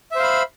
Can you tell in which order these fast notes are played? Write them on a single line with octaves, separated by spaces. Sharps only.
E5 C5 F5 B5